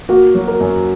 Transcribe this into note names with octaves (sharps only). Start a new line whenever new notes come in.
A#3 F#4
F#3
A#4
F#2